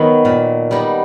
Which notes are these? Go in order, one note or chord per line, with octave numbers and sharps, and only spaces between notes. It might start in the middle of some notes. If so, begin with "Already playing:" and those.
Already playing: D#3 F#3 B3
A#2
G3 B3 D#4